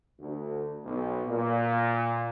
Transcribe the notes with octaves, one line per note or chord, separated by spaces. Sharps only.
D2
B1
A#2